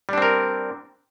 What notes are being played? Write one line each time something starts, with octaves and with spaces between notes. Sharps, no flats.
G3 C4 D4 A#4